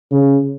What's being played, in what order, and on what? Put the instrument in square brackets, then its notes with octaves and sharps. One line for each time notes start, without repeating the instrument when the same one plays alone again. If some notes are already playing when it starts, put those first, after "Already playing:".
[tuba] C#3